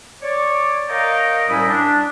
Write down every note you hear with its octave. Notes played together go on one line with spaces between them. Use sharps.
C#5 D5
A#4 C#5 D#5 F5 G5 A#5
C2 A2 G3 C#4 E4 D#6
D4